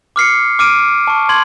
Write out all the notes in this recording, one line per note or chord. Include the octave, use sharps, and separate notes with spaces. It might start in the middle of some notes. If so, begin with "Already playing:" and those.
D6 F6 C7 C#7
D6 F6 D7 D#7
A5 C#6
C6 G#6 F#7